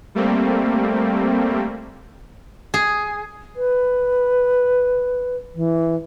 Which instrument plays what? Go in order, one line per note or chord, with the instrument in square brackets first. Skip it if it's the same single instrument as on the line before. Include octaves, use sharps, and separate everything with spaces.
[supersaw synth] G3 A3 A#3 C4
[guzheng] G#4
[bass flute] B4
E3